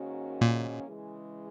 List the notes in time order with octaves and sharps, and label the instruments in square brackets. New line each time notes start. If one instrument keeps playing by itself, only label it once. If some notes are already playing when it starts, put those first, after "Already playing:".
Already playing: [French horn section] G#2 D#3 A#3 C#4 F#4
[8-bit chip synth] A#2
[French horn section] C#3 E3 G#3